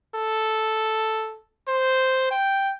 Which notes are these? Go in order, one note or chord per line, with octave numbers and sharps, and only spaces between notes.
A4
C5
G5